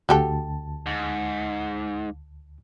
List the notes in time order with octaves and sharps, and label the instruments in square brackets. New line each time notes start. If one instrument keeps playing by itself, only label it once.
[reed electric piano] D2 A5 [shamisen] F#4 G4 A4
[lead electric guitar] G#2